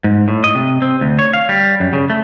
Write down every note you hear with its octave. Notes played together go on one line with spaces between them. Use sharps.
G#2
A2
D#5
C3
C4
D2
C#5
F5
G3
F#2
C#3
A3